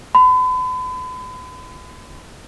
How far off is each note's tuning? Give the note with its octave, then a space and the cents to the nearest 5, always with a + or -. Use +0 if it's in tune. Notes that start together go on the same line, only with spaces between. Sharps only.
B5 +40